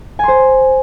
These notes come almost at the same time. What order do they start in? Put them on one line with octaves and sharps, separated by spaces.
G#5 C6 C5